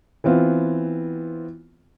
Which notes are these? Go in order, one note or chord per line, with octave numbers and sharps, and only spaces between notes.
E3 B3 C4 F4